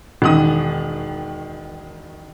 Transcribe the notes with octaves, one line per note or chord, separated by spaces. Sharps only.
E1 D#3 D#6